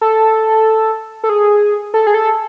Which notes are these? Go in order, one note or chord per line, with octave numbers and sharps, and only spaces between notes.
A4
A4
G#4
A4
G#4
A4